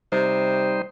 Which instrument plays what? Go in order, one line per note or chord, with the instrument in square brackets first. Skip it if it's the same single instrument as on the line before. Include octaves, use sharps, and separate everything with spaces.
[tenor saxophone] C3 [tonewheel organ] G3 D#4 C5